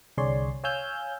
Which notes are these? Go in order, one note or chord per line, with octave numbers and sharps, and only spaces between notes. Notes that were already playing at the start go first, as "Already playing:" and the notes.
C2 D3 G#4 C#5 D5 C6
C#5 F5 G#5 E6 F6 G6